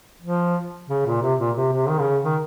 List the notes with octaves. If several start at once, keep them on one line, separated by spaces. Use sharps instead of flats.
F3
C#3
A#2
C3
A#2
C3
C3
D#3
C#3
D#3